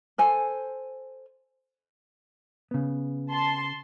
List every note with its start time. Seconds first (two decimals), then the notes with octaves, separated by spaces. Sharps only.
0.18 A4 C5 G#5
2.71 C#3 B3
3.31 A5 C6